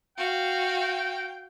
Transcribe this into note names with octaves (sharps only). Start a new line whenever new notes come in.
F#4 F5 G5